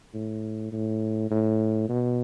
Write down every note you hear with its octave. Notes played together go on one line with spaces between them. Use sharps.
A2
A2
A2
B2